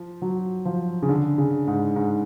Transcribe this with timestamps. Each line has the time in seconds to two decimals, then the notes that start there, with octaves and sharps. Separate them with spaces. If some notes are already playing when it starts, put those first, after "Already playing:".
Already playing: F3
0.22 F#3
0.65 F3
1.02 C#3
1.09 D3
1.38 C#3
1.67 G#2
1.96 G#2